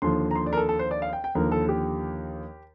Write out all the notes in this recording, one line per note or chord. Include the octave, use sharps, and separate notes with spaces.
D#2 D3 F3 C6
A#5
C6
D5
A#4
A4
A4
C5
D5
F5
G5
G5
D#2 D3 F3 A#4
A4
G4